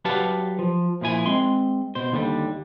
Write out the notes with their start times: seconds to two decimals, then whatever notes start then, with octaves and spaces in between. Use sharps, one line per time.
0.05 F#3 G4 B4 F5 F#5 A5
0.59 F3
1.01 A#2 F3 E4 G#5
1.26 G#3 C4 C6
1.95 B2 C5
2.12 D#2 D3 G3